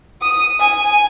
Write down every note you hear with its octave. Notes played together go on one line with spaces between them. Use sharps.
D#6
G#5